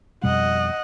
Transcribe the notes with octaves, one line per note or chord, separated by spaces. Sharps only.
F2 B2 G3 D#5 F#5